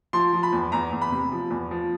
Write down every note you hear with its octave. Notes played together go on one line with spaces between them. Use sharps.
F3 C6
F3
B5
E2
E2 A#5
E2
B5
C3
F3
E2
F3